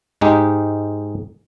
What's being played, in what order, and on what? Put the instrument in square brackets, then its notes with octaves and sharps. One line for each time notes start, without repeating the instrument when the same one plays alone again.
[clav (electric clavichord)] G#2 G#3 D#4 G4